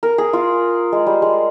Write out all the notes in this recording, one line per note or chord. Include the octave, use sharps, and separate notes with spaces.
A#4
G#4
F4
G#3
G3
G#3